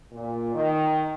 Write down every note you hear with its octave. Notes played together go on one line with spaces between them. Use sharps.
A#2
D#3